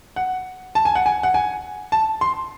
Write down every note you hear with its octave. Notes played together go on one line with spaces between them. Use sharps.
F#5
A5
G#5
F#5
G#5
F#5
G#5
A5
C6